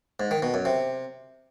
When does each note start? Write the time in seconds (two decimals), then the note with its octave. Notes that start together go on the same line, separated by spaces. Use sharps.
0.20 G#2
0.31 D#3
0.42 B2
0.54 F#2
0.65 C3